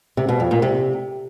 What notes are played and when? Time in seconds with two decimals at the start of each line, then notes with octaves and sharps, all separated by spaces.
0.17 C3
0.29 B2
0.40 F2
0.51 A#2
0.62 C3